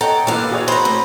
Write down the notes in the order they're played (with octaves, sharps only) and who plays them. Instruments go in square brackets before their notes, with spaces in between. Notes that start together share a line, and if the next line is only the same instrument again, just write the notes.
[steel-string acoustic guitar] A4 G5 A#5 [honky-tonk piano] C#5 D#5 F#5
[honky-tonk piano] A#2 E3 B4 [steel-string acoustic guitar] A4 F5
[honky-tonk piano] F#4 G#4 C#5
[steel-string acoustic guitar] C5 A#5 [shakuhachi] B5
[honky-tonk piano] A3 [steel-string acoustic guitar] C4